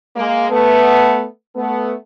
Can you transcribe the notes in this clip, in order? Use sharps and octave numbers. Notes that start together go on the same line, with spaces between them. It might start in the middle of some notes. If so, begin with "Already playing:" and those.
G#3 A#3
A3 B3
A3 B3